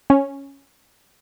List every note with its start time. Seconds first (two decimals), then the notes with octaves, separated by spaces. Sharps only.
0.10 C#4